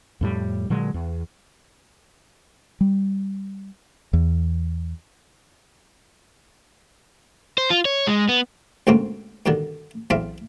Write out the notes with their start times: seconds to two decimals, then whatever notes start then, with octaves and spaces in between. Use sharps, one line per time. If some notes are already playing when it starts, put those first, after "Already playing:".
0.21 F2 A2 G3
0.70 A#2 D3 F#3 G#3
0.94 E2
2.81 G3
4.13 E2
7.58 C5
7.70 F4
7.85 C#5
8.07 G#3
8.29 B3
8.87 D2 G#2 B2 A#3 C4 C#4
9.46 G2 B2 D3 D#3
10.10 B1 E2 C4 E5 F5